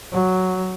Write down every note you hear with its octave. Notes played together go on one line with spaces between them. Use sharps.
F#3